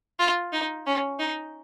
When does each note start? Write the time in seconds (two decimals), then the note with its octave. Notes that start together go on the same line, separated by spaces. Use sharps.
0.19 F4
0.53 D#4
0.86 C#4
1.19 D#4